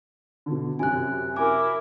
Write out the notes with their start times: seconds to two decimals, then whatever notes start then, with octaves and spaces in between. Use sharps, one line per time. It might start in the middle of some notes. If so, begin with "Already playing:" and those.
0.46 B2 D3
0.79 F#2 C3 G#5 F#6
1.36 E4 A#4 G#5 D6